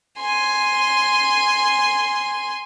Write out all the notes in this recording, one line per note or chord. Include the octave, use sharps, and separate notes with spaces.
G#5 C6